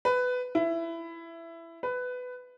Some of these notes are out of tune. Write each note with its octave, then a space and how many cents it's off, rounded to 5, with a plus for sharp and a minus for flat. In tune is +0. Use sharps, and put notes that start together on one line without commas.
B4 +15
E4 +15
B4 +15